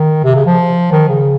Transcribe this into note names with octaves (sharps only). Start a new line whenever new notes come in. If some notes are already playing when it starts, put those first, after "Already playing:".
Already playing: D#3
C3
C#3
F3
D#3
C#3